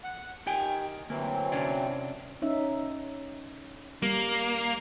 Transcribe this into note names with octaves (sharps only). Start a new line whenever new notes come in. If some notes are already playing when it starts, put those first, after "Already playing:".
F#5
D#3 G4 G5 G#5
D2 E3 F#3 A#3 C4
C3 C#4 D4
C#4 D#4 E5
G3 A#3